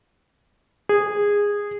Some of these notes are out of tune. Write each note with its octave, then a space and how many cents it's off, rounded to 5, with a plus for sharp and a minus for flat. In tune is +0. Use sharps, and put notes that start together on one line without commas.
G#4 -15